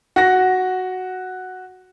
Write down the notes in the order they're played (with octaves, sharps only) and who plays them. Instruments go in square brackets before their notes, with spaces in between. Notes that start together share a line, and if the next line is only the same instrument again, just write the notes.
[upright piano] F#4 A#6